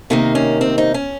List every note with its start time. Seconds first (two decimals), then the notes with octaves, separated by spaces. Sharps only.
0.10 C3 D#3 A#3 D#4
0.35 C#4
0.61 C4
0.78 D#4
0.94 C#4